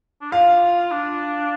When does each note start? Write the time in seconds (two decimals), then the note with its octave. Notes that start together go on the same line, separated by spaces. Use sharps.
0.22 D4
0.32 F4 F5
0.91 D4